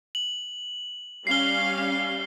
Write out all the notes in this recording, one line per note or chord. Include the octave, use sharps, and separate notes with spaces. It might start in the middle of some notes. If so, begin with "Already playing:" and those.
F#7
G3 C#4 F5 C7 G7